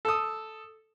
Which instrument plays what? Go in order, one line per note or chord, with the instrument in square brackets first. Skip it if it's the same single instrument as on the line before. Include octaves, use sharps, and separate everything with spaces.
[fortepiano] A4 D#6